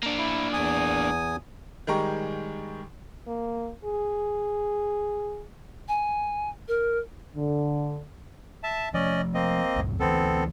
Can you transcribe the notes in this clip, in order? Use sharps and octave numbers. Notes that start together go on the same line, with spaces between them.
A#3 D4
E4
E2 G#5 D#6
D#3 G3 G#3 G5 A#5 C#6
A#3
G#4
G#5
A#4
D3
E5 A5
F3 A3 C#4 D5 D#5
A#3 C4 D#5
C2 F#2 A2
D2 D#3 E3 B3 C4 A4